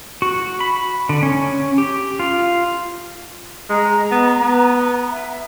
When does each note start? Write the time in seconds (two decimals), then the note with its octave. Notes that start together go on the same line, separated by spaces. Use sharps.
0.22 F#4
0.60 B5
1.09 D3
1.23 C#4
1.78 G4
2.19 F4
3.70 G#3 A#5
4.11 B3
4.42 B3
5.11 E5